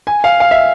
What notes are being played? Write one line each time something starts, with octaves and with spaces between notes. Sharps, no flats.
G#5
F5
F5
E5